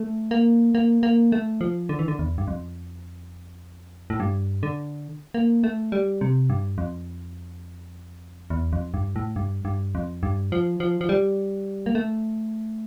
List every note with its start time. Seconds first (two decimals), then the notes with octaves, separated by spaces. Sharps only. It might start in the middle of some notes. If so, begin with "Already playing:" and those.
Already playing: A3
0.31 A#3
0.75 A#3
1.03 A#3
1.32 A3
1.61 F3
1.89 D3
1.99 E3
2.08 D3
2.19 E2
2.38 G2
2.48 F2
4.10 A2
4.20 G2
4.63 D3
5.34 A#3
5.64 A3
5.92 G3
6.21 C3
6.50 G2
6.78 F2
8.50 E2
8.73 F2
8.94 G2
9.16 A2
9.36 G2
9.65 G2
9.95 F2
10.23 G2
10.52 F3
10.80 F3
11.01 F3
11.09 G3
11.86 A#3
11.95 A3